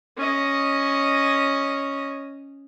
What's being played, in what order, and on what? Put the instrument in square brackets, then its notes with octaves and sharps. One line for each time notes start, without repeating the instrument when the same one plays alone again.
[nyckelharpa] C#4 D#5